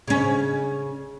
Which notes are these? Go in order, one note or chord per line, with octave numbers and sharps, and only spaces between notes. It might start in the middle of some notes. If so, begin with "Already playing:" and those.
C#3 C#4